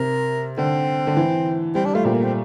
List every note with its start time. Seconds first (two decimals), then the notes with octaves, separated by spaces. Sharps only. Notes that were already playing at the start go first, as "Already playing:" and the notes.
Already playing: C3 A#4
0.58 D3 C4
1.07 D3
1.17 E3
1.75 G3 C4
1.85 G3 D4
1.95 A3 F4
2.05 A#2 C4
2.14 A#3
2.24 C4